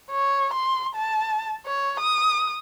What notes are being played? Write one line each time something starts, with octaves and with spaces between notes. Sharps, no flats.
C#5
C6
A5
C#5
D#6